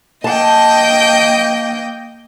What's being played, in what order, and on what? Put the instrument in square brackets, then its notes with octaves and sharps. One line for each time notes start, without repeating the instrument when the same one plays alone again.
[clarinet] A#3 [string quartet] D#5 G5 [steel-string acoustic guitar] A5